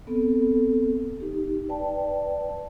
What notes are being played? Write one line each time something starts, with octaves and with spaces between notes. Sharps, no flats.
B3 C4 A4
D#4 G4
B4 D5 G5 A5